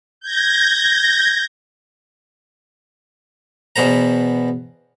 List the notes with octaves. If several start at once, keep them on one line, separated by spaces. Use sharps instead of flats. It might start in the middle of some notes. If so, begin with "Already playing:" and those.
G6 G#6 A#6
E2 B2 B3 C5 A#5